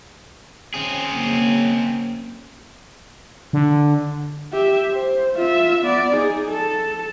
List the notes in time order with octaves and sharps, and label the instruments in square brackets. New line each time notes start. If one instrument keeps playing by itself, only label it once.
[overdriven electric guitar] C4 G#4 [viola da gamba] C#4
[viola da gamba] C#3 F#3 A#3
[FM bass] D3
[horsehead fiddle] G4 E5
C5
F4 E5
B3 D5
D#4 G#4
A4 A5